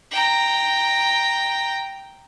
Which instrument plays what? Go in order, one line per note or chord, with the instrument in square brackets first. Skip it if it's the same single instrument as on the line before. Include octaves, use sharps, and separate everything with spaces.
[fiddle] G5 A#5